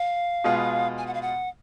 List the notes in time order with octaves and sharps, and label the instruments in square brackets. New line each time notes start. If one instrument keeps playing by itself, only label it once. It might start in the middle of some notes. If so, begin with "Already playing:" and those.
Already playing: [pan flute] F5
[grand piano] B2 G#3 B3 F4
[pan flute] G#5
F#5
F5
F#5